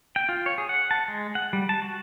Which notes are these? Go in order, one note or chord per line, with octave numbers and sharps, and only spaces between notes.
G5
F4
C#5
G#4
F#5
A5
G#3
F#5
G3
A5
F#4